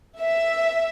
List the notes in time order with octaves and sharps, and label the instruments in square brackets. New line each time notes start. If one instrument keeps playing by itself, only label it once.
[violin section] E5